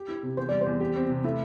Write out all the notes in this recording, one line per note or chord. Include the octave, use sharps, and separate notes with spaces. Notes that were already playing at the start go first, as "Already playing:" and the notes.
Already playing: G4
E4
C3
E2 C5
G3 D5
C5
E2
G4
C4
C3
A3 E4